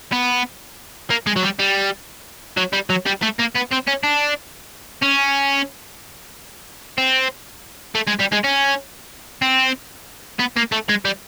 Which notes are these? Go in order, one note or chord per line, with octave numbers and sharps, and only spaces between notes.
B3
A#3
G#3
F#3
G3
G3
F#3
G3
F#3
G3
A3
A#3
B3
C4
C#4
D4
C#4
C4
A3
G#3
G3
G#3
C#4
C4
B3
A#3
A3
G#3
G3